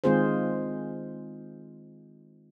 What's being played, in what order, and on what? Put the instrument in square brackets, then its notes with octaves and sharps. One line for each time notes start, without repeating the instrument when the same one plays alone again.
[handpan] D#3 G#3 C4 F4 G#4 C5